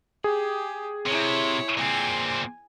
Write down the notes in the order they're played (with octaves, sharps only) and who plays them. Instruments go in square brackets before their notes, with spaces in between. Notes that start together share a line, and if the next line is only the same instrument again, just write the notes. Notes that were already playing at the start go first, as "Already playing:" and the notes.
[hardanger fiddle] G4 [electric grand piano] G#4
[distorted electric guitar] C3 [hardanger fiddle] E4 C#5
[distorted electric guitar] A#2 C4 [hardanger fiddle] G#5